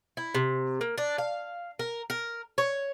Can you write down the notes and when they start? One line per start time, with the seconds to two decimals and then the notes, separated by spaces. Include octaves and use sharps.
0.17 E4
0.35 C3
0.81 A#3
0.98 D4
1.18 F5
1.79 A#4
2.10 A#4
2.58 C#5